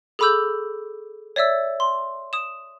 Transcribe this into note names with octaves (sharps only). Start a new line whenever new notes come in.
G#4 A4 B5 D6 E6 G6
C#5 D5 E5 E6
C6
D#6 E7